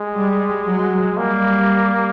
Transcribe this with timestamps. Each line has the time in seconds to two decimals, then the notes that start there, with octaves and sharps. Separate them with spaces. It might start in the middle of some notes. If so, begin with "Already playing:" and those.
Already playing: G#3
0.16 G3
0.66 F#3
1.17 G3 A#3